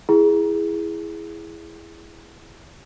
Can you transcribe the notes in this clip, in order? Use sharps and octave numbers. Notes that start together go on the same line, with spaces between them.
E4 G#4